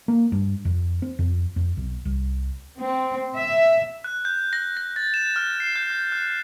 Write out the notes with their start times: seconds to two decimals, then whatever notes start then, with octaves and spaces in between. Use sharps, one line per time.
0.08 A#3
0.32 G2
0.65 F2
1.02 C4
1.19 F2
1.56 F2
1.77 B1
2.05 C2
2.80 C4
3.37 E5
4.04 F#6
4.25 G6
4.53 A#6
4.77 A#6
4.96 A6
5.14 E7
5.36 F6
5.60 C7
5.76 G6
5.90 G6
6.12 F#6